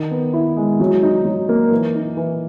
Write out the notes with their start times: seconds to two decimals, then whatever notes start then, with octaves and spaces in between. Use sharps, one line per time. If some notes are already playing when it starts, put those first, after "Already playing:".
Already playing: D#3
0.11 B3
0.33 E4
0.57 G#3
0.80 F#3
1.03 D#4
1.25 F#3
1.49 A#3
1.71 E3
1.95 D#4
2.17 E3